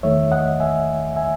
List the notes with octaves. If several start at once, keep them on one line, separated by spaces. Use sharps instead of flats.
E2 D#3 A3 C#5 E5
D#5 F#5
E5 G#5
E5 G#5